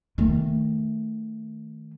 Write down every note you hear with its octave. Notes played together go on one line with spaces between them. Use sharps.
D#3 A3